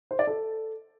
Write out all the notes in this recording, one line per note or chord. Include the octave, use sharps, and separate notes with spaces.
C5
D5
A4